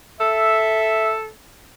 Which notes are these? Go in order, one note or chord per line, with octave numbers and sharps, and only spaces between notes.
A4 E5